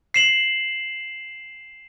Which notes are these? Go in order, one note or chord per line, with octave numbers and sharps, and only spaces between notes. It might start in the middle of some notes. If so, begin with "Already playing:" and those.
C7 E7 F#7